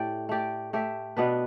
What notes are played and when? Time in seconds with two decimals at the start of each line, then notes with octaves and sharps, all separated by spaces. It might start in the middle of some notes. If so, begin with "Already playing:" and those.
Already playing: A2 A3 G4 D5
0.29 A3 G4 D5
0.73 A3 G4 E5
1.17 B2 B3 D4 B4